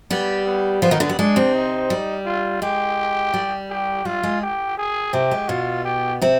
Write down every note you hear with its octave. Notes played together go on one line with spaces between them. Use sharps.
G3 B3 G4
B3
F3 B3 F4
D#3 D#4
D3 D4
G3
G#3 D4
C3 C4
D#4
G3
F4
G#3 G4
G3
G4
G3 F4
G#3
G4
G#4
C3 C4 G4
G#3
B2 B3 F4
G4
C3 C4